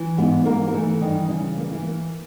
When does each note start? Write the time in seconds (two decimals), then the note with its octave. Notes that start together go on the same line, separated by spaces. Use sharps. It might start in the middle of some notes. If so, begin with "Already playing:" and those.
Already playing: E3
0.17 G#2 B3 B4
0.45 E3 A#3 A#4
0.68 A#4
0.74 E3 A3 A4
1.01 G2 D#3 D#4
1.25 D#4
1.29 C#3 E3 E4
1.57 A#3
1.71 E3 E4
1.85 A#3